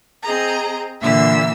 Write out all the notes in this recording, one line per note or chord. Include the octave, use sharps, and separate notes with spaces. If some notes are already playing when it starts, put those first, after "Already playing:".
C4 G#4 D#5 A#5
A#2 D3 E3 A#3 E5 E6